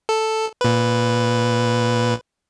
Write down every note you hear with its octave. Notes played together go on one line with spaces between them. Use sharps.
A4
A#2 B4